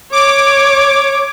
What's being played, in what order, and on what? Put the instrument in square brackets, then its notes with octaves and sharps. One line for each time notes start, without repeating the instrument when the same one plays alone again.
[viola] C#5 [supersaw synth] D6